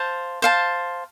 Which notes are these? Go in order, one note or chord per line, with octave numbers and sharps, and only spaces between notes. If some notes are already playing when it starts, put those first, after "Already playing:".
Already playing: C5 F5 A5
C5 F5 A5